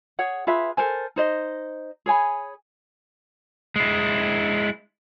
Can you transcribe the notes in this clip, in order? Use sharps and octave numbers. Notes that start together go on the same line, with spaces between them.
G#4 C#5 F#5
F4 G#4 B4 E5
A4 A#4 C5 G#5
D#4 C5 D#5
G#4 C#5 G#5 B5
G#3 E4